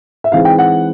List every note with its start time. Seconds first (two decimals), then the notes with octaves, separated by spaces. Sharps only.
0.24 E5
0.32 E3 G#3 C4 D#4 F5
0.45 G5
0.59 F#5